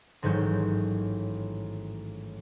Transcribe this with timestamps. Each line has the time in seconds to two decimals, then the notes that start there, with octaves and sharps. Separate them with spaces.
0.23 A1 G#2 D#3 F#3 G6